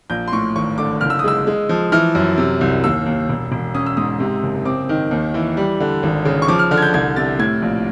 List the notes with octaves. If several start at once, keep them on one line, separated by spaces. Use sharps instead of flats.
A#1 G6
C6
A2 C#6
G#1 C#6
D3 D6
F#1 F6
E6
D#6
G#3 E6
G#3
F3
E3 F6
F#2
C3
C2
D#2 E6
D#2
E1
E1
C#4 D#6
E6
G#2 D#6
C3
F#1
C4 D6
D#3
D#2
E3
G3
D3
G#1
C#3
C#6
F3 D6
F6
D3 F6
G#6
G6
C2 G#6
C3 A6
A2 G#6
A#1